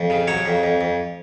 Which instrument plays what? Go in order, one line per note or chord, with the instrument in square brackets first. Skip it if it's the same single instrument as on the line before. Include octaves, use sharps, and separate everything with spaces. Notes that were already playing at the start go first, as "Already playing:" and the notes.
Already playing: [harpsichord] F2
C#3
F#3 C#5
F2
F2
F2